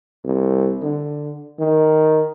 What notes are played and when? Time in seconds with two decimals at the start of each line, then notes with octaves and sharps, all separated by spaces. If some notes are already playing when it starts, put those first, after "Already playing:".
0.24 C2
0.83 D3
1.59 D#3